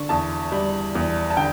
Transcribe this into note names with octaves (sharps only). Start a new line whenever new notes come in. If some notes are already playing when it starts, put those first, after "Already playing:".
Already playing: D3 C#6
E2 A5
G3
E2
A5
D3 G5